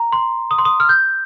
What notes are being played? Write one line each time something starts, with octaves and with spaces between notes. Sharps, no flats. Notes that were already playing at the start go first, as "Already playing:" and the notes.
Already playing: A#5
C6
D#6
C6
D#6
F6
G6